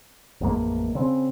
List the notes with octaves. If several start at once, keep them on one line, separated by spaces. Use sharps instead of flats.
A1 F2 G#3 A#3
C#3 C4